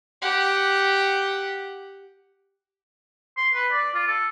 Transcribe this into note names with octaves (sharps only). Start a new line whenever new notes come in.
G4 F#5
C6
B4
D5
F4
A4